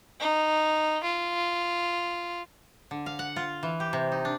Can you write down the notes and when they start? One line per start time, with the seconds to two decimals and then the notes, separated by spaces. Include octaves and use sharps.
0.20 D#4
1.03 F4
2.91 D3
3.06 F5
3.19 F#5
3.36 F4
3.63 E3
3.80 G4
3.93 C3
4.12 D#4
4.25 D4